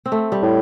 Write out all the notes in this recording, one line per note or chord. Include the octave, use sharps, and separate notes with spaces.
C4
A3
G3
A2